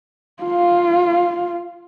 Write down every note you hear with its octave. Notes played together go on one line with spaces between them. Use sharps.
F4 F5